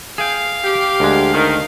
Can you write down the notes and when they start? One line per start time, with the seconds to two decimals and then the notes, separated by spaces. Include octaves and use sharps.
0.18 G#4 F5 G5
0.64 G4
1.00 D2 G#3
1.34 D#3